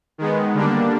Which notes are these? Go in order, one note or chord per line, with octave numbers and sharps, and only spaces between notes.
D#3 G#3 B3
D3 G3 A#3 D4